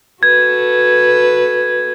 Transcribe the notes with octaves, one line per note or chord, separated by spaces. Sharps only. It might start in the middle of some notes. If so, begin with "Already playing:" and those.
F#4 A4 B4 G#6